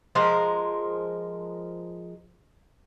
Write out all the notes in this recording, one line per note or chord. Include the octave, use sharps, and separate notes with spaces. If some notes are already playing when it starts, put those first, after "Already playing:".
F3 G#3 A#4